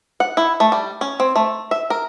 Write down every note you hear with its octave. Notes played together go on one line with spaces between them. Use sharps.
F#5
E4
A3
G3
C#4
C4
A3
E5
A#4